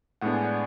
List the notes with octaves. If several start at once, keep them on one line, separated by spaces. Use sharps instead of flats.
A2 G#3 B3 D4 F#5
G#5
D5 F#5